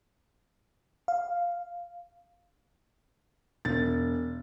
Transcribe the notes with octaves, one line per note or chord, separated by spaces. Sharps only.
F5
E1 A6